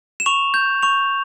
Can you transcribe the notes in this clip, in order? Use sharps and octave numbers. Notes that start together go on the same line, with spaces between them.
E7
C#6 F7
G6
C#6 F7